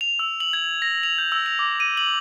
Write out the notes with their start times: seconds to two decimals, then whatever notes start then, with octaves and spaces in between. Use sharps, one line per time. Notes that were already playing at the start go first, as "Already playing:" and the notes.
0.01 F7
0.19 E6
0.40 F#7
0.53 G#6
0.82 A#6
1.03 F7
1.18 G6
1.32 E6
1.46 F7
1.59 D6
1.80 D#7
1.97 F#7